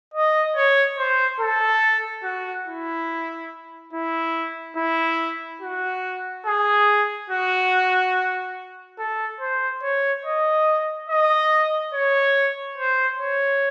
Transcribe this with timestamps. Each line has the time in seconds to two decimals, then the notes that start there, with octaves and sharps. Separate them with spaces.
0.14 D#5
0.56 C#5
0.98 C5
1.40 A4
2.24 F#4
2.67 E4
3.93 E4
4.76 E4
5.61 F#4
6.46 G#4
7.30 F#4
8.99 A4
9.40 C5
9.83 C#5
10.25 D#5
11.09 D#5
11.93 C#5
12.78 C5
13.19 C#5